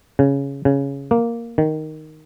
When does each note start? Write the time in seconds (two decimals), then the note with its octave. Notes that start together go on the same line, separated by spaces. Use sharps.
0.19 C#3
0.65 C#3
1.11 A#3
1.58 D#3